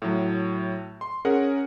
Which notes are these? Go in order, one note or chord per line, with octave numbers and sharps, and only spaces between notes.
A2 F#3
C6
C#4 G#4 A#4 F#5